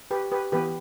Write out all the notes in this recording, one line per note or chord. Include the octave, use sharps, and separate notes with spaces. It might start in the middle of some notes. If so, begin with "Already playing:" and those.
G4 B4
G4 B4
E3 B3 G4 B4